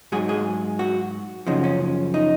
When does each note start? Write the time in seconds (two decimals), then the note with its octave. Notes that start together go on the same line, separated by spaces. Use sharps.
0.12 G#2 F#3 G#4
0.29 G#4
0.79 F#4
1.47 F#2 C#3 F3 D#4
1.64 C#4
2.14 D#4